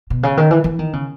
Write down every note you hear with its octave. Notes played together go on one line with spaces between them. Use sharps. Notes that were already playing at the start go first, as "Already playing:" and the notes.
B2
C#3
D#3
E3
E3
D#3
C#3